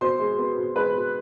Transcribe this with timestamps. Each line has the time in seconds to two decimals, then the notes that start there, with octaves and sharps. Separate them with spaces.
0.01 B2 C5 C6
0.19 G#3
0.38 B3
0.58 B2
0.76 G#3 B4 B5
0.95 B2